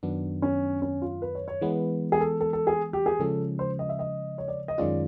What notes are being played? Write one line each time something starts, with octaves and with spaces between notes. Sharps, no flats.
F#2 D#3 F#3 B3 D4
C#4
C#4
F4
B4
C#5
C#5
E3 G#3 B3 B4
G#4
A4
A4
A4
G#4
G4
G#4
C#3 F3 G#3 C#4 A4
C5
D#5
E5
D#5
C#5
D5
D#5
F#2 D#3 G#3 C#4 F4 D5